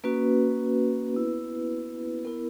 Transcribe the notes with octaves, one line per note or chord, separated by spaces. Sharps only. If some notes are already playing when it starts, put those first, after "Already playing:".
A#3 C#4 F#4 B4
B3 E4
B3 E4 A#4